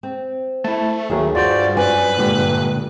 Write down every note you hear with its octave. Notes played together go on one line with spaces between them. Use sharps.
C4
A3 E4 A5
D#2 D#3 F#3 A3 G#4
G2 F4 F#4 C5 D5
F#2 B4 D5 G#5
A#2 D3 G#3 G4 A#4